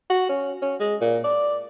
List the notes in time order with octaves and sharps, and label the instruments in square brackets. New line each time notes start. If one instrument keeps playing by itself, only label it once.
[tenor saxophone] F#4
C#4
C#4
G#3
A#2
D5